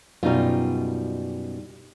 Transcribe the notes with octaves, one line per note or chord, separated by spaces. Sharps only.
F#2 B2 G3 D#4 F4